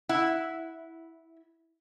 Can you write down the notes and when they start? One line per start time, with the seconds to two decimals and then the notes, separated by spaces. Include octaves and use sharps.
0.09 E4 F#5